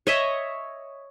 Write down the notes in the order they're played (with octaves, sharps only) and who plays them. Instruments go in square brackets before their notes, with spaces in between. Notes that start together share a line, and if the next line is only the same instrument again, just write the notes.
[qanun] C#5 D#5 E5